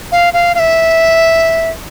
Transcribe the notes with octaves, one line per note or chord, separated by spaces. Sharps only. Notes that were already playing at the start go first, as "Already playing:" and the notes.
F5
F5
F5
E5